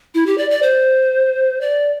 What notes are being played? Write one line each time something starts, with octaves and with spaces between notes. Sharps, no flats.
E4
G4
D5
D5
C5
D5